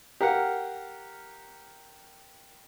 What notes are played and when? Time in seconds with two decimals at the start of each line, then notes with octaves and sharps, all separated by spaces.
0.21 G4 A#4 F5 F#5